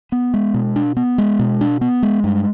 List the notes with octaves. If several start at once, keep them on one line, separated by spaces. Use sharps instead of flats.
B3
G#3
B2
D4
B3
G#3
B2
D4
B3
G#3
G2